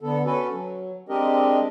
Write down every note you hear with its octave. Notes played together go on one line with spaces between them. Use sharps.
D3 B3 A4
C#4 F#4 A4 B4
F#3
G#3 C4 D4 G4 A#4 D#5